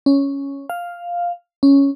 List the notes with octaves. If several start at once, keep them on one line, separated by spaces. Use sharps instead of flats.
C#4
F5
C#4